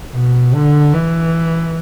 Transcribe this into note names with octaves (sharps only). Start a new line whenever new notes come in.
B2
D3
E3